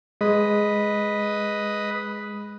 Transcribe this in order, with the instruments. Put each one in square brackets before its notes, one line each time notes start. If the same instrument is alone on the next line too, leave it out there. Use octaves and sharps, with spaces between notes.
[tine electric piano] G#3 [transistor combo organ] B4 D#5